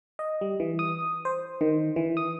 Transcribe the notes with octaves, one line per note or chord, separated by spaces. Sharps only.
D#5
G3
E3
D#6
C5
D#3
E3
D#6